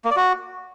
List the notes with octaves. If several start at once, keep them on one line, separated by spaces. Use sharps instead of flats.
A#3
D5
F#4